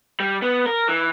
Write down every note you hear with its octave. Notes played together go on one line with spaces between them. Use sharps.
G3
B3
A#4
E3